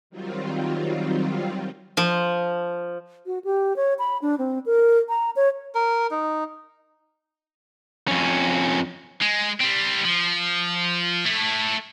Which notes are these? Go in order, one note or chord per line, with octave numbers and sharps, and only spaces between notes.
D#3 F#3 G3 C4 F4
F3
F#4
G4
C#5
B5
D4
C4
A#4
A#5
C#5
A#4
D#4
F2 C#4
G#3
G3 C4
F3
A3 E4